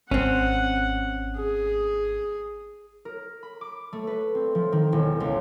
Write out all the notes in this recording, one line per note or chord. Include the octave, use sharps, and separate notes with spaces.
G#1 C4 C#4 F#5
G#4
A#4
B5
D6
A3
B4
C4
F3
D#3
E1
C#2